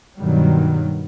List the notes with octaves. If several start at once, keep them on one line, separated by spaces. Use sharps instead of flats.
G2 B2 D#3 F#3 G3